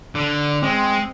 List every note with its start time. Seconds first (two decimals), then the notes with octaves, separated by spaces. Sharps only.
0.15 D3
0.63 G#3 C4